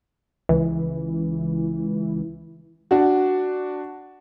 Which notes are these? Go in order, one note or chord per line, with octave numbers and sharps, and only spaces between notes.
C#2 E3
D4 F#4